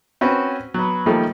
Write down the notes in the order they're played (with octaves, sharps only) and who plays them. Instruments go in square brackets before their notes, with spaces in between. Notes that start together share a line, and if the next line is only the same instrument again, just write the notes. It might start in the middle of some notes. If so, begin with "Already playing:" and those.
[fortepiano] C4 C#4 F#4 B4
F#3 B3
D#3 F3 G3 A3 A#3 A4